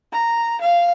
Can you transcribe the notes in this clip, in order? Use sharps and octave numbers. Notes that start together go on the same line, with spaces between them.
A#5
F5